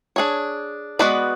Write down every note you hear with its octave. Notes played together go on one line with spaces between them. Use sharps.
D4 G#4 C#5
G#3 B3 F#4 B4 D5